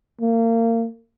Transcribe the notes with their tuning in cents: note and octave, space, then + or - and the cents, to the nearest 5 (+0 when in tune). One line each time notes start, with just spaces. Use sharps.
A#3 -30